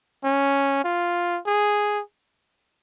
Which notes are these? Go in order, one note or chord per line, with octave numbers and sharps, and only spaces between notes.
C#4
F4
G#4